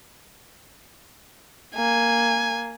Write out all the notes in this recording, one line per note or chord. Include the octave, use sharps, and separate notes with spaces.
A#3 G#5